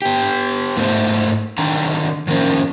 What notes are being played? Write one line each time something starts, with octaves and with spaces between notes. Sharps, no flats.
B3 G4
G#2 A3 E4 A4 C5
D3 D#3 C4 A#5
F2 D#3 A#3 C4 C#4